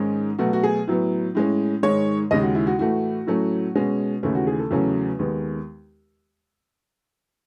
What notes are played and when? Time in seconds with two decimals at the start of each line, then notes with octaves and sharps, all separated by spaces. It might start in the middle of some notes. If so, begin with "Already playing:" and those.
Already playing: G#2 D#3 G#3 C#4
0.39 B2 F#3 A3 F#4
0.53 F#4
0.63 G#4
0.87 A2 F#3 B3
1.35 A2 G#3 C#4
1.83 G#2 D#3 G#3 C#5
2.31 D#2 C#3 G#3 D#5
2.42 F#4
2.55 E4
2.67 F#4
2.79 A2 E3 A3 F#4
3.27 A2 F#3 A3 C#4
3.75 B2 G#3 C#4
4.23 D#2 C#3 E3 A3 C#4 E4
4.35 F#4
4.47 G#4
4.59 A4
4.71 E2 C#3 F#3 A3 C#4
5.19 D#2 D#3 G#3 B3